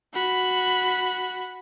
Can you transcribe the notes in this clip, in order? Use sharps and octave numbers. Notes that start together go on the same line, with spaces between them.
F#4 B5